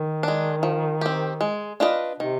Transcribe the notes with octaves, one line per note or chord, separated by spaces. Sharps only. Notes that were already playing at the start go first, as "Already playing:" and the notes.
Already playing: D#3
G#3 D4
F3
C4 G4
G#3
D4 F4 B4 D#5
C3 D#3